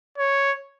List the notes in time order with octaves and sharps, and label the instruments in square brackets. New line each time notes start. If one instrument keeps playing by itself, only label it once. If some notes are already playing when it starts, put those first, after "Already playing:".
[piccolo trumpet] C#5